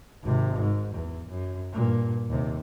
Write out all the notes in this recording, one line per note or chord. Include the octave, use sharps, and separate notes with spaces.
G#1 C3
G#2
E2
F#2
G2 A#2
D#2 C3